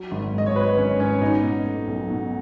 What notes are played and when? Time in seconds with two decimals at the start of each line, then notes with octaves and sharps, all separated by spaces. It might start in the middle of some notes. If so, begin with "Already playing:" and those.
Already playing: F#3
0.11 G#1
0.33 G#2 D#5
0.46 C#5
0.55 F#3 B4
0.77 G#1 C#4
1.00 G#2 C#4
1.21 B2 D#4
1.43 B2
1.66 A3
1.88 B1
2.10 B2